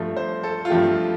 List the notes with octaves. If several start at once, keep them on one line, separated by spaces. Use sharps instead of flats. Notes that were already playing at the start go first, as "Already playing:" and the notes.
Already playing: G2 F3 A3
C5
A4
F4
G2 F3 A3 G4